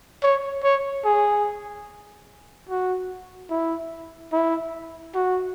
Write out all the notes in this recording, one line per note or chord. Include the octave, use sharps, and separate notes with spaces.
C#5
C#5
G#4
F#4
E4
E4
F#4